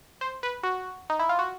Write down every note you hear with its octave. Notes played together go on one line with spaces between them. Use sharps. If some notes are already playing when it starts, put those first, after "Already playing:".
C5
B4
F#4
D#4
E4
F4
F#4